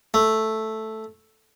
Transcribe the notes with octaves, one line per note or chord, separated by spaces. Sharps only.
A3